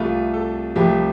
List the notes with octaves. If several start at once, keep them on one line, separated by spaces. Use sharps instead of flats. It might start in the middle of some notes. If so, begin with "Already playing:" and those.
Already playing: C2 C3 A3 F4
A4
C2 C3 F3 A3 G4